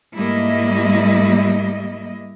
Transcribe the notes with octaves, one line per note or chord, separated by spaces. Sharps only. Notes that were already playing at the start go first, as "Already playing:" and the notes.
G#2 G3 A3 A#3 E4 D#5